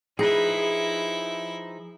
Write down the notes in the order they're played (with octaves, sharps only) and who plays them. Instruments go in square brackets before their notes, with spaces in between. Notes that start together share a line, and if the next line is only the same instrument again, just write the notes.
[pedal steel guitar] F3 D#4 B4 [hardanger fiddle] E4 E5 [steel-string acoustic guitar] G#4